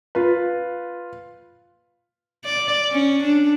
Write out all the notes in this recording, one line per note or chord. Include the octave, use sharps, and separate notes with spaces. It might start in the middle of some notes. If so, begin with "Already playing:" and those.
F4 B4
D5
C#4
D4